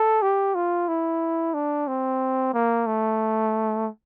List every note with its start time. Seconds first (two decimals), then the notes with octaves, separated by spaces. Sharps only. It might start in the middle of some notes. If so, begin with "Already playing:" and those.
Already playing: A4
0.22 G4
0.55 F4
0.88 E4
1.54 D4
1.88 C4
2.54 A#3
2.87 A3